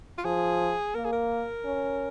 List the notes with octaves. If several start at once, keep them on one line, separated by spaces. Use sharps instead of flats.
F4
F3 G#4
A#3 A#4
G#4
A#4
C#4